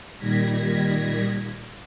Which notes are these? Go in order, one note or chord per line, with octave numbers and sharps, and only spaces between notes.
A#2 D#3 G3 G#6 A#6 B6